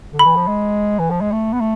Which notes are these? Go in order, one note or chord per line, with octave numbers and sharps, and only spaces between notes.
D3
B5
E3
F3
G#3
E3
F3
G#3
A3
B3
A3